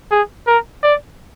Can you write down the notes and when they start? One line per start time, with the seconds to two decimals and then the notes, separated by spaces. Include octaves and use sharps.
0.11 G#4
0.47 A#4
0.83 D5